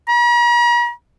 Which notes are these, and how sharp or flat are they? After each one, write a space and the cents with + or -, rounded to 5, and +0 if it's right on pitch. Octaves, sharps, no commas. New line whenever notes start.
A#5 +45